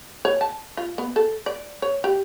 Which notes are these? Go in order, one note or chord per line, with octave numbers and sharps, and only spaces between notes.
C#5
A5
F4
B3
A4
D5
C#5
G4